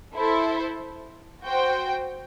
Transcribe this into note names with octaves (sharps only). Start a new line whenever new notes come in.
E4 A4 C5
F#4 C5 G5